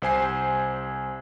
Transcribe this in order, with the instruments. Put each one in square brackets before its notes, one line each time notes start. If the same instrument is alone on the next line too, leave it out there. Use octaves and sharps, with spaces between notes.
[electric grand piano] C2 C5 G#5 C7